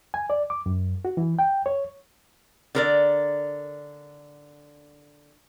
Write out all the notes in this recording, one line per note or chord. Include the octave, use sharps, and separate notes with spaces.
G#5
D5
D6
F#2
F#4
E3
G5
C#5
D3 A#4 D5